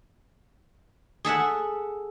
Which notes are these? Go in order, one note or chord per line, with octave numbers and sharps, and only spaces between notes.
G#4 A4 E5 F#5